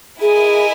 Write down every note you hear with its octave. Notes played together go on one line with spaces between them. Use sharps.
E4 G#4 A#4 D#5 G#5